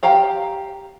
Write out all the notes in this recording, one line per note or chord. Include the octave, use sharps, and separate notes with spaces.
G4 F5 G5 A#5